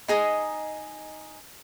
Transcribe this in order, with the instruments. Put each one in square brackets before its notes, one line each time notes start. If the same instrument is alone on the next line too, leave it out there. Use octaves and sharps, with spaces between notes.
[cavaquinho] D#4 G#4 D#5 A#5